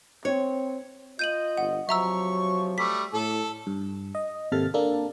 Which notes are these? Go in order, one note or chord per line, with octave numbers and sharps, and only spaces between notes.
C4 C#5
F4 D#5 G6 D#7 F#7
G1 F#5
C3 F3 F#3 E5 A#5 C#6 E6
G3 A3 B6
A2 A4
G2
D#5
G#1 C3 A#3 A4 F6 A6
A#3 D4 A4